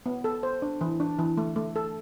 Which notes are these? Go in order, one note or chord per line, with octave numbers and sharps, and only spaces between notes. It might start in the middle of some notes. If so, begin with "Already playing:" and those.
B3
A4
C5
D4
E3
D4
E3
A3
A3
A4